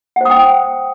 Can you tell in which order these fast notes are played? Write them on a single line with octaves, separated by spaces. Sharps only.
F#5 C5 D#6 G5